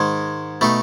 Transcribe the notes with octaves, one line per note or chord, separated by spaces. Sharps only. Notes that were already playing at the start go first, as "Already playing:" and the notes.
Already playing: G#2 D#3 G#3
B2 A3 D#4